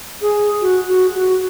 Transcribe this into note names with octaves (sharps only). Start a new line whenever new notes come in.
G#4
F#4
F#4
F#4